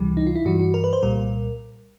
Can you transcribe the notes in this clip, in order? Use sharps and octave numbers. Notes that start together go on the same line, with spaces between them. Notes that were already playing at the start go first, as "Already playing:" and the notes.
Already playing: C#2 C3 E3 G3
D#4
F4
E4
G2 E3 G3 F#4
F#4
A#4
B4
C5
C2 A#2 G3 A#4